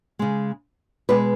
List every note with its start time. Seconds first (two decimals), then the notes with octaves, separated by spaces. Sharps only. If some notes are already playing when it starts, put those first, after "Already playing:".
0.19 C#3 G#3
1.09 B2 G#3 B4